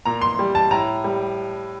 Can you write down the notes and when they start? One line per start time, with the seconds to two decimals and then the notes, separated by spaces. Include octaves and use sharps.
0.05 A#2 A#5
0.21 C6
0.39 G3
0.55 A5
0.71 A2 A#5
1.04 G3